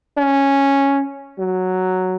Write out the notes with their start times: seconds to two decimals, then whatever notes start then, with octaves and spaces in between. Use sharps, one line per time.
0.17 C#4
1.39 F#3